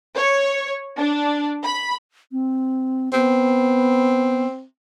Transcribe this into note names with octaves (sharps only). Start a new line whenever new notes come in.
C#5
D4
B5
C4
B3 C4